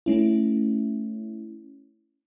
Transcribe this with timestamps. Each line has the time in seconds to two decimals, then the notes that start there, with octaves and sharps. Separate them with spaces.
0.06 A3 C#4 E4